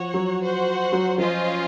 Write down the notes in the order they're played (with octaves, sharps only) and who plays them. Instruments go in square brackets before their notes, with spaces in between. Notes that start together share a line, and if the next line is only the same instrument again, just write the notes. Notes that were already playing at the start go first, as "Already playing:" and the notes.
Already playing: [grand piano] F3 [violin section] F#4 C#5 F#5
[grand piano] F#3
[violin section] F#4 C5 F#5
[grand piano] F#3
[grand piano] F3 [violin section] C#4 F4 C5 D#5